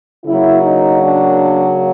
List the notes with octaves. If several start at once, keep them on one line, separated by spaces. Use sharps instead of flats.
C#3 F#3 A#3 E4
D#4
D4